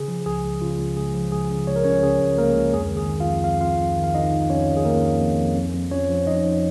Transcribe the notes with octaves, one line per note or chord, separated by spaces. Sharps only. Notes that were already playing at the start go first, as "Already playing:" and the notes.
Already playing: C#3 G#4
F3
C#2 G#4
C#2
C#3 F4
C#2
C#2 G#4
F3
C#2 G#4
C#3
C#2 C#5
A#4
C#2 C#4 C#5
C#3 G#4
C#2
C#2 A#3 A#4
C#2
F2 G#4
D#3
G#4
D#3
F4 F5
F2
F2 F5
F2 F4 F5
F2
D#3
F5
D#3 D#4 D#5
D#3
F2 C#4 C#5
D#3
G#4
D#3 A#3 A#4
F2
F2
F2
F2
F2
F3 C#4 C#5
F3
F2 D#4 D#5
F3